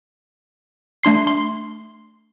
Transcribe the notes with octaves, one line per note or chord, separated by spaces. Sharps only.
A3 D4 C6 C7
C6